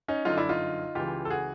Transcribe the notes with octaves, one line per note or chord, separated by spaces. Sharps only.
C#4 D#4
G1 F#2 D3 D#4 F4
D4 E4
D#4 F4
C#2 C#3 E3 F4 G4
A4
F#4 G#4